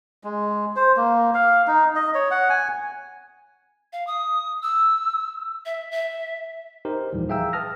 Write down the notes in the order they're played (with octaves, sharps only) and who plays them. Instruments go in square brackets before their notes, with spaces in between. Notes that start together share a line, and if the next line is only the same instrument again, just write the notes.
[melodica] G#3
C5
A#3
F5
D#4
D#5
C#5
F#5
G#5
[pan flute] F5
D#6
E6
E5
E5
[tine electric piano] D#4 G4 A#4 C5
D#2 A#2 E3 F3 G3
G#4 E5 F5 G5 A#5 E6
B4 A5 D#6 F6 A#6